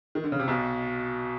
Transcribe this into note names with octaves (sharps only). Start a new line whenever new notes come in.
D#3
D3
C#3
C3
B1 B2